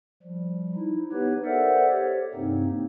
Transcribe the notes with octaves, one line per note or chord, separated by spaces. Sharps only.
F3 G3
D#4 E4
B3 D#4 G4 B4 C#5
A4 A#4 C5 D5 E5 F#5
G4 C#5
G2 C3 A#3 C4 D#4